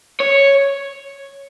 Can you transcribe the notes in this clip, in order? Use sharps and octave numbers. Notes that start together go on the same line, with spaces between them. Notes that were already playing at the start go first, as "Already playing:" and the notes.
C#5